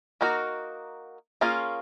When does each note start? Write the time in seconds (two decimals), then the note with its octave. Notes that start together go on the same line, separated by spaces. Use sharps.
0.21 A#3 D#4 F#4 A#4
1.41 A#3 C#4 F4 G#4